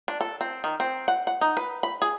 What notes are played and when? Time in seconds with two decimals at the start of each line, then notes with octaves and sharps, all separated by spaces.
0.08 D4
0.21 A4
0.41 C4
0.64 D#3
0.80 C4
1.08 F#5
1.27 F#5
1.41 D#4
1.57 B4
1.83 B5
2.02 G#4